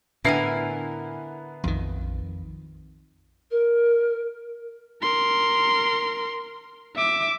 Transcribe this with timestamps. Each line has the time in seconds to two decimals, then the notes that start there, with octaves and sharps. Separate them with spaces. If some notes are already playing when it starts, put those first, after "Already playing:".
0.25 A2 D3 B3 E4 A#4 G#5 C7
1.64 A#1 F2 D#3
3.51 A#4
5.02 A#4 C6
6.96 E5 D6